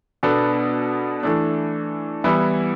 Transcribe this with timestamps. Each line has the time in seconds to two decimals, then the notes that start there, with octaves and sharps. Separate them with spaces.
0.23 B2 B3 D4 A4
1.23 E3 A3 D4
2.24 E3 G3 B3 E4